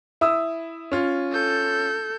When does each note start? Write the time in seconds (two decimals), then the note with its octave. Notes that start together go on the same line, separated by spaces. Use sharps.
0.21 E4 D#6 E6
0.92 C#4 F4
1.32 A4 G6